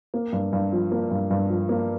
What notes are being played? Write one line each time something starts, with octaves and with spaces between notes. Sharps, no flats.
A#3
G2
G2
F3
A#3
G2
G2
F3
A#3